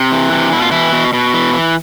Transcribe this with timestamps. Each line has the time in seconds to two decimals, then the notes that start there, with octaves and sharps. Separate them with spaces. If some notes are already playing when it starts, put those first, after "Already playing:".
Already playing: C3
0.12 E3
0.32 C3
0.52 B2 E4
0.62 F4
0.71 B2 E3 E4
0.92 B2
1.13 B2
1.33 E3
1.54 E3